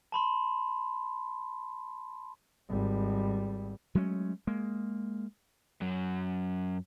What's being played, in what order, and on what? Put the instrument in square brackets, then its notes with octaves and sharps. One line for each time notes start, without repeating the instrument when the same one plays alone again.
[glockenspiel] A5 B5 C6
[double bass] G#1 G3
[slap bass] F#3 G#3 A3 C#4
G#3 A#3
[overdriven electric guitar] F#2 F#3